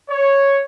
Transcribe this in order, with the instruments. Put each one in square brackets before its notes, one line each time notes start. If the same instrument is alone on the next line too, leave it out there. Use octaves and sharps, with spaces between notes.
[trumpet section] C#5